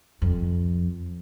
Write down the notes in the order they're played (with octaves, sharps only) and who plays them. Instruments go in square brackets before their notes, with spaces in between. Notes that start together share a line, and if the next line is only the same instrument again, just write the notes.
[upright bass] F2